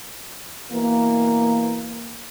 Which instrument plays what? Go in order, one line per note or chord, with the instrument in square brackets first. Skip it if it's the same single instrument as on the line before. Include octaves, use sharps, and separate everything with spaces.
[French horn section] B2 E3 A#3